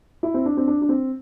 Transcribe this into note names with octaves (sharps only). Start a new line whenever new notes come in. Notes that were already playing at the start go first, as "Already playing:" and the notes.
E4
C4
D4
C4
D4
D4
C4